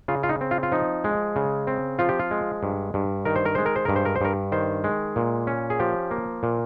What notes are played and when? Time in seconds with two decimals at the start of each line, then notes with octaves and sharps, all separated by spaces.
0.08 C#3 F4
0.23 F4
0.29 D#4
0.41 C4
0.51 F4
0.63 F4
0.72 F3 D#4
1.04 G#3
1.36 C#3
1.67 C4
1.99 F3 F4
2.09 G4
2.19 F4
2.31 G#3
2.63 G2
2.94 G2
3.25 D#3 A#4
3.36 C5
3.45 A#4
3.55 G#3 C5
3.66 A#4
3.76 C5
3.85 G2 A#4
3.96 C5
4.05 A#4
4.16 C5
4.21 G2 A#4
4.52 D#3 C5
4.84 G#3
5.16 A#2
5.47 C#4
5.70 G#4
5.80 F3 G4
6.11 A#3
6.43 A#2